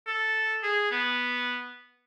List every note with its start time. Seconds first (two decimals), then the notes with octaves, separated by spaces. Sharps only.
0.07 A4
0.63 G#4
0.91 B3